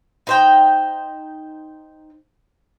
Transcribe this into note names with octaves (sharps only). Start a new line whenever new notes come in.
D#4 C5 G5